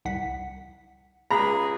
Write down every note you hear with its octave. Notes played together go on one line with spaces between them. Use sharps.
C2 F#5 B6
C#2 G#4 A#5 B5